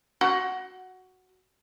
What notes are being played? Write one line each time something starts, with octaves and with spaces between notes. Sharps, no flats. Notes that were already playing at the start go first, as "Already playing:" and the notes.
F#4 F#5